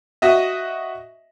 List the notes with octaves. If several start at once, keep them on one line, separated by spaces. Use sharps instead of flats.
F#4 D#5 E5